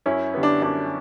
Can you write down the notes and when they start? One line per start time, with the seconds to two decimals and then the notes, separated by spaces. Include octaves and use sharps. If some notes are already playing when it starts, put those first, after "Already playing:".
0.06 F#2 C#4 E4
0.34 D3 G3 B3
0.43 D4
0.62 F#2 D4